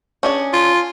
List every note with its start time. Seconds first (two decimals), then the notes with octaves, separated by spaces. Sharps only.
0.23 C#4 D4 G#4
0.53 F4